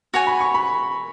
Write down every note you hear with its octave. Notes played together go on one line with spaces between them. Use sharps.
F#4 C#5 G#5 C#6
B5
C#6
B5